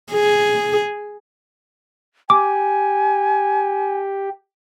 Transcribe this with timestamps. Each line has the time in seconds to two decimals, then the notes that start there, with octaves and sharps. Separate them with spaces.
0.12 G#4
2.30 G4 G#5 D6